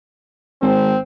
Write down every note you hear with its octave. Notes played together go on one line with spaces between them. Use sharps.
G#1 C4